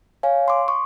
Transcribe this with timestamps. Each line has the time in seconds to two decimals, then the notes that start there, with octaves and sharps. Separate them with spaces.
0.23 C#5 F5 G#5
0.48 C6 D6
0.68 C#6